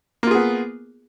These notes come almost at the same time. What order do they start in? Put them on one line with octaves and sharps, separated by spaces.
A#3 F4 G#4 B3